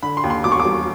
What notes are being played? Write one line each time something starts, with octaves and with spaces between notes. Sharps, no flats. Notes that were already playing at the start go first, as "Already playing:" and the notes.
D3 B5
C6
D#2
C6
E1 D6
C#6
D6
G3